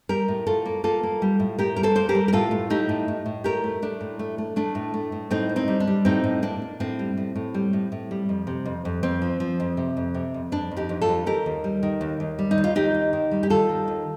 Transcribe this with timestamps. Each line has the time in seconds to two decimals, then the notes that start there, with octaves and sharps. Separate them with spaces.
0.09 G3 G4 A#4
0.28 A2
0.47 A2 F4 A4
0.66 A#3
0.84 A#3 F4 A4
1.03 A#3
1.22 G3
1.40 A2
1.59 A2 G4 A#4
1.76 G3 A#4
1.83 A4 C5
1.95 A#3 C5
2.09 G4 A#4
2.15 G3
2.28 A#4
2.33 A2 F4 A4
2.51 A2
2.70 A3 D#4 G4
2.89 A2
3.08 A2
3.26 A2
3.44 A3 G4 A#4
3.64 A3
3.82 A3 D4
4.01 A2
4.19 A3
4.38 A3
4.56 A3 D4
4.75 A2
4.94 A3
5.12 A2
5.31 A2 C4 D#4
5.49 A#3
5.56 C4 D#4
5.68 G3
5.80 D4
5.87 G3
6.05 A2 C4 D#4
6.24 A2
6.42 A#3 D4
6.62 A#3
6.80 A2 C4
6.99 G3
7.17 A2
7.36 A2
7.54 G3
7.73 A2
7.92 A2
8.11 G3
8.29 F2
8.47 C3
8.66 F2
8.85 F2
9.03 F2 C4
9.22 F3
9.40 F3
9.60 F2
9.77 C3
9.97 F2
10.14 C3
10.34 F2
10.52 F2 D4
10.71 F2
10.77 D#4 G4
10.89 F2
11.01 F4 A4
11.09 F2
11.26 D#2 G4 A#4
11.46 D#2
11.64 G3
11.83 D#3
12.01 D#2
12.20 D#2
12.39 G3
12.51 D#4
12.58 D#2
12.64 F4
12.75 D#3 D#4 G4
12.94 D#2
13.13 D#3
13.31 G3
13.43 G4
13.50 G3 F4 A4
13.69 D#3
13.88 D#2